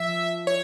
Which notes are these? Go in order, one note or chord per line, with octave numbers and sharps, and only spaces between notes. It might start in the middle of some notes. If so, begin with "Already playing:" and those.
Already playing: F3 E5
C#5